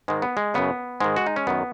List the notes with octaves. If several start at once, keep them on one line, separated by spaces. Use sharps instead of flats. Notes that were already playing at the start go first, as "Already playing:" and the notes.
G#2 D#3 G#3
B3
G#3
F#2 C#3 B3
G#2 D#3 G#3
F#4
D#4
C#4
F#2 D#3 B3